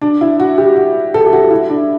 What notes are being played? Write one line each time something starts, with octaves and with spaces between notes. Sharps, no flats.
D4
E4
F#4
G4
F#4
A4
G4
F#4
E4
D4